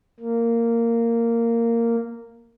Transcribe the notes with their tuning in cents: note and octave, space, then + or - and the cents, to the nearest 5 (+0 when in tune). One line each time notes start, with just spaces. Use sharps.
A#3 -10